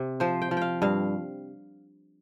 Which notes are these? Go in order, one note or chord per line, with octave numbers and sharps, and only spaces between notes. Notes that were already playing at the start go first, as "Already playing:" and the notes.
Already playing: C3
F3 C5
G5
F3
F5 G5
G2 F5